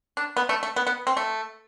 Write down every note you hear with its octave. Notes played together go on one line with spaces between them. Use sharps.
D4
B3
A3
A3
B3
B3
C4
A3